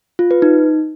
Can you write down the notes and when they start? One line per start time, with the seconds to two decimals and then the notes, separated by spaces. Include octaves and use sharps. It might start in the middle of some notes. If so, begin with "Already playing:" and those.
0.19 F4
0.31 B4
0.42 D#4